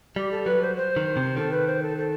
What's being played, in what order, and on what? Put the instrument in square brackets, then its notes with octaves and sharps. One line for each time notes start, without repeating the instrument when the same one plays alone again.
[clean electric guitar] G3 [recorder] G4
[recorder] A4
[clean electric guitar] F#3 [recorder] B4
[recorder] C5
C5
[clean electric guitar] D#3
C3
[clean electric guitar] D#3 [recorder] A4
[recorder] B4
C5
A4
A4